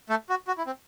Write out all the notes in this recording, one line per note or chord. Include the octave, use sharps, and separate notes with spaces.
A3 A4
F#4
F#4
E4
C4